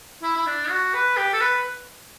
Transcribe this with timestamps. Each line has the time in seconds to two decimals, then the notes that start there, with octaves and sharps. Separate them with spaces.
0.23 E4
0.36 E4
0.47 D4
0.70 F#4
0.94 B4
1.17 G4
1.33 A4
1.41 B4